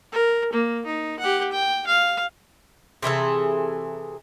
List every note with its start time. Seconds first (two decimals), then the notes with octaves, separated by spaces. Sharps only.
0.12 A#4
0.53 A#3
0.86 D#4
1.19 G4 F#5
1.52 G5
1.87 F5
3.02 C3 E3 G#4 A4